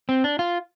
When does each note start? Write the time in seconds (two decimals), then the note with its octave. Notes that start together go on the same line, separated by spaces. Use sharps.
0.09 C4
0.24 D4
0.39 F4